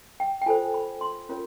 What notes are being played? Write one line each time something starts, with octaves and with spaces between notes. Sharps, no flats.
G5
G5
F4 A4 C5 G#5
B5
C6
C#4 F4 A#4 C#5